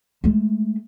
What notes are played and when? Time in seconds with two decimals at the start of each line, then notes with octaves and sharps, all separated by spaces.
0.24 G#3 A3